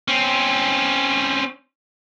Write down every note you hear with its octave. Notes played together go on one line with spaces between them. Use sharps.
C4 C#4